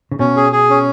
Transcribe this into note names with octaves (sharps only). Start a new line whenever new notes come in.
C#3
B2 C#4
G#4
G#4
C#4